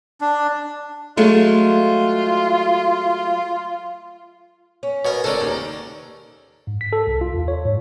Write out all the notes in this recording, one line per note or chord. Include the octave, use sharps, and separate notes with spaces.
D4
F#3 G#3 A3 F4
C#4
B2 A#4 C#5
A2 C#3 G#3 C#4 A4 A#4 C5 D5
D#2 D5 A#5
G#2
B6
A4
C2
F4
E2
C#5
G#2